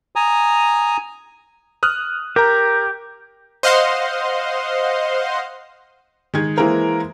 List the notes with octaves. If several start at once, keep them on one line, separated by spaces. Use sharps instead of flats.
G#5 A#5 D#6
D#6 F6 F#6
G4 A#4 A#5
C5 D#5 F5 F#5 C6
D#3 G#3 G#4 G#6
E3 G#3 A#3 E4 A#4 C5